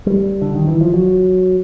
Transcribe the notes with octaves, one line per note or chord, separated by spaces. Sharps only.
G3
D3
D#3
E3
F3
F#3